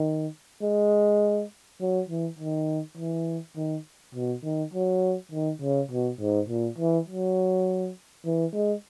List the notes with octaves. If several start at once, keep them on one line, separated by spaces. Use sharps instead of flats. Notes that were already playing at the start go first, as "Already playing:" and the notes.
Already playing: D#3
G#3
F#3
E3
D#3
E3
D#3
B2
D#3
F#3
D#3
C#3
B2
G#2
A#2
E3
F#3
E3
G#3